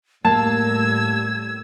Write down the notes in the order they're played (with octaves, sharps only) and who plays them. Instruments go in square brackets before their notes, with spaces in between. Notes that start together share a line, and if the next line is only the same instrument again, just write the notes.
[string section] A2 G3 E6 [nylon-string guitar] A#3 [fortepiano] A5 [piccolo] G#6